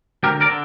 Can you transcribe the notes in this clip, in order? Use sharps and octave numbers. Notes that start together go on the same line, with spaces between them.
D2 G4 A#4
A#4 D5
D3